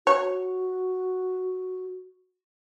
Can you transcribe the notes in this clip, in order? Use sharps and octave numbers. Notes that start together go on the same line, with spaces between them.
F#4 C#5